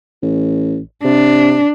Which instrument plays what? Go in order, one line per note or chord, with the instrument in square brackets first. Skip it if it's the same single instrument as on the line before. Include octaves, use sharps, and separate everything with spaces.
[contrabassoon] A1
[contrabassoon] C3 [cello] D4